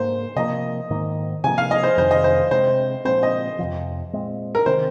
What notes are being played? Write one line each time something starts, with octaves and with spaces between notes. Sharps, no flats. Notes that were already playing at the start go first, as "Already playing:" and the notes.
Already playing: G#2 A#3 C5
C3 F3 A#3 D#5
G#2 D#3 A#3
C3 F3 A#3 G#5
F5
D#5
C5
F2 C3 D#3 C5
D#5
C5
C3 G#3 C4 C5
A#2 F3 G#3 C4 C5
D#5
F2 C3 F3
A#2 G#3 C4
A#4
C3 D#3 C4 C5